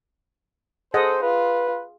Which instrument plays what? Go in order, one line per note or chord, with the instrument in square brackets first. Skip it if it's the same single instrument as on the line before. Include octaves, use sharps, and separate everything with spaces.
[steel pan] G#4 D#5 F#5 [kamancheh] A4 [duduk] C5
[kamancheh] F4 [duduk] B4